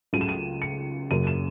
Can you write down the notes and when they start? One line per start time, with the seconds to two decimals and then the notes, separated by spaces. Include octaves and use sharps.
0.13 C#2 C#3 F#3 A3 D#7
0.21 E7
0.29 D#7
0.62 C#7
1.11 F#1 F#2 C#3 D#7
1.27 E7